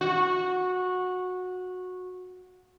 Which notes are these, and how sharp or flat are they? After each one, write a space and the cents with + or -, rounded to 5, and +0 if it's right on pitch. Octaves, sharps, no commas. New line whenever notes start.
F#4 -15